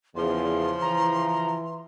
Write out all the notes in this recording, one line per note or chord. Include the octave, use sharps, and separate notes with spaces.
E2 C#3 F3 C6
E3 A#5